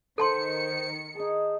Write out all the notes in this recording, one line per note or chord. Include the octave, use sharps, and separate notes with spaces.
D#3 A4 C5 A5 C6 C#7
D#4 G#4 A5